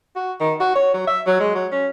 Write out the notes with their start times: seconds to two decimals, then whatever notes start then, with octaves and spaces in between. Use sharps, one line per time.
0.16 F#4
0.40 D#3
0.60 F#4
0.75 C#5
0.94 F#3
1.07 E5
1.27 F#3
1.40 G#3
1.55 F#3
1.72 C#4